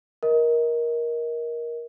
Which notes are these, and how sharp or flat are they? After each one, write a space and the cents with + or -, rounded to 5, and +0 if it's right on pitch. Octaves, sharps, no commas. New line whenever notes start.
A#4 +15 D#5 +30